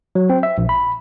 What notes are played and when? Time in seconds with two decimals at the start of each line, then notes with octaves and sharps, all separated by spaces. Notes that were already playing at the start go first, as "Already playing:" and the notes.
0.15 F#3
0.30 C4
0.43 E5
0.58 A#1
0.69 B5